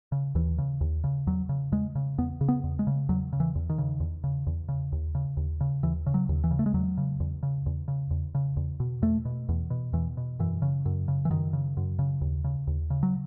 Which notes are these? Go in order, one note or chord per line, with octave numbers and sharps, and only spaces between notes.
C#3
D#2 E3
C#3
D#2
C#3
E2 F#3
C#3
E2 G#3
C#3
E2 B3
C#3
B3
E2
G#3
C#3
E2 F#3
C#3
E3
E2
D#3
C#3
E2
C#3
E2
C#3
D#2
C#3
D#2
C#3
D#2 E3
C#3
F#3
D#2
E3
C#3
A3
G#3
E2 F#3
C#3
E2
C#3
E2
C#3
E2
C#3
E2
B2
E2 A3
B2
E2
B2
E2 E3
B2
F#2 E3
C#3
F#2
C#3
E3
F#2 D#3
C#3
F#2
C#3
D#2
C#3
D#2
C#3
F#3